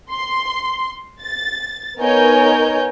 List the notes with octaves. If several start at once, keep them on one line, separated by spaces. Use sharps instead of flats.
C6
A6
B3 D#4 A#4 C#5 G#5 G6